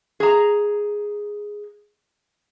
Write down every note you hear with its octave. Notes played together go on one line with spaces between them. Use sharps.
G#4 A#5